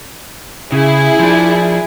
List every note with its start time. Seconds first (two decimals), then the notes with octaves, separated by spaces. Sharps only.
0.72 C#3 E4 G#4
1.19 F3 D4